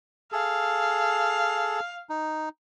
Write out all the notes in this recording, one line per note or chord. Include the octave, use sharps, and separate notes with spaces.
G#4 A4 F5
D#4